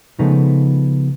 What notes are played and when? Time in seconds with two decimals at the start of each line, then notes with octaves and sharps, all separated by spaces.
0.19 C#3 F3 G#3 A3 B3 D#4